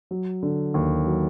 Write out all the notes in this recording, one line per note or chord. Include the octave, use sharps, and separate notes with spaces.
F#3
D3
D#2
F#3